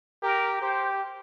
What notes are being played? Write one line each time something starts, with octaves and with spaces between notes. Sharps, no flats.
G4 A#4
G4 C5